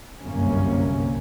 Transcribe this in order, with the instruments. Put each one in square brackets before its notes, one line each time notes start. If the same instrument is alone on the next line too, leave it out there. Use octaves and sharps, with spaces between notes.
[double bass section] G1 C2 F#2 C3 A#3 C#4